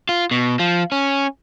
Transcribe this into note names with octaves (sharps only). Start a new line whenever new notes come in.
F4
B2
F3
C#4